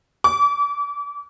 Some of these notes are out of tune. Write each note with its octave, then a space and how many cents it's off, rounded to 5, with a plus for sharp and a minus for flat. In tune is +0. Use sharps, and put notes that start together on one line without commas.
D6 -35